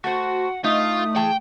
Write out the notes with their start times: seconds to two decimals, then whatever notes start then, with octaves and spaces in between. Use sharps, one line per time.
0.04 A3 F#4 C5 F#5
0.64 A3 D#4 F4 D#6
1.16 E3 G#4 G5 A5